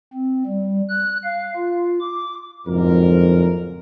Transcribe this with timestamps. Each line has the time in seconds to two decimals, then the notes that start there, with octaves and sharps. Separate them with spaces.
0.14 C4
0.46 G3
0.89 F#6
1.24 F5
1.56 F4
2.01 D6
2.67 F#1 F2 G#2 A#4